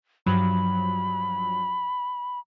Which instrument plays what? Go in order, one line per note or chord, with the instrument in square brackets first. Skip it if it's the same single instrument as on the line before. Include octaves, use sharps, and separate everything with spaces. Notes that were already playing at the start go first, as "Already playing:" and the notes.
[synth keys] G2 F3 F#3 [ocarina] B5